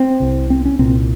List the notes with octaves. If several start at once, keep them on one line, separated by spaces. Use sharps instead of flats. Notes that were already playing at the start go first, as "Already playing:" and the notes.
Already playing: C4
C2 C3
C4
C#4
C2 A#2 C4